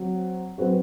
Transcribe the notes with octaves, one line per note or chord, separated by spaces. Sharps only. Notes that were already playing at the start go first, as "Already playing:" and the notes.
Already playing: F#3 C4
F#3 C4 F#4 B4